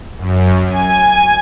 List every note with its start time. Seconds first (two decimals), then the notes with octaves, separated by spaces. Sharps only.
0.18 F#2
0.67 G#5